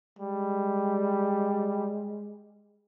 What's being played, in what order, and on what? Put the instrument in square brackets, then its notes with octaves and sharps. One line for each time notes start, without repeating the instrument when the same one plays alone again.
[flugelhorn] G3 [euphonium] G#3